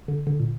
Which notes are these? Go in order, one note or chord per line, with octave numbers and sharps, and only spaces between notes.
D3
D3
A#2